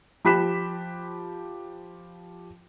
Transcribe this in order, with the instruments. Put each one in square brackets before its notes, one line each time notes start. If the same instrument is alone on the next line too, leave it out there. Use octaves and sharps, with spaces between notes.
[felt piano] F3 G4 B5 F#6 B6 E7